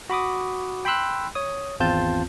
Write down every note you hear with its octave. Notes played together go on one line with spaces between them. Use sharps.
F#4 B5 D6 D#6
G5 B5 C6 E6 F#6
C#5 D#6
G#1 E2 C4 F4 A5 G6